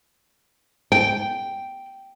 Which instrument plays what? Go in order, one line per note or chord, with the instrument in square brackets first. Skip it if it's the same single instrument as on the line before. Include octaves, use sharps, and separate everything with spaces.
[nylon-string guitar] G5